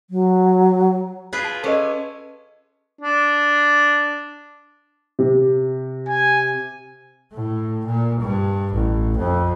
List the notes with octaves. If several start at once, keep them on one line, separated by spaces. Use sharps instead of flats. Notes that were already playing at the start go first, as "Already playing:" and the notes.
F#3
F4 G#4 B4
A5
C#4 A4 B4 D#5
D4
C3
G#5
A2
A#2
G2
A1
F2